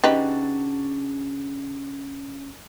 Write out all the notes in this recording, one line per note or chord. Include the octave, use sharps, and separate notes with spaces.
C#3 D4 D#4 F#4 G4 B4